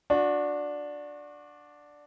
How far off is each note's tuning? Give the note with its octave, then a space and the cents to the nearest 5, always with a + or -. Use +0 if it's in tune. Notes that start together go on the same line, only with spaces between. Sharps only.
D4 +0 F#4 -30